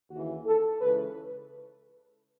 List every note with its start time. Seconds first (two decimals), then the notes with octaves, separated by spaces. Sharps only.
0.11 D#2 C#3 E3 F#4
0.46 A4
0.81 C#2 C#3 E3 B4